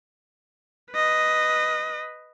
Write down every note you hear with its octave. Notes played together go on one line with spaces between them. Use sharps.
B4 D#5